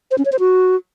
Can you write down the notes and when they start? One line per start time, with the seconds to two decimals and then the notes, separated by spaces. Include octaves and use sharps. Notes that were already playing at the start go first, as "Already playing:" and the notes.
0.11 C5
0.18 C#4
0.25 C#5
0.32 C5
0.39 F#4